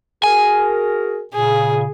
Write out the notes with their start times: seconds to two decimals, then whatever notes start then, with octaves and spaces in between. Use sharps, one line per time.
0.24 F#4 G#4 A#4 G#5
1.34 A#2 C#3 G#4